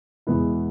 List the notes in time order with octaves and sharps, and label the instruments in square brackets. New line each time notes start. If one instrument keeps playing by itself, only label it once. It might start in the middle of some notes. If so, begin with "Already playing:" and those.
[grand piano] E2 B2 G#3 B3 E4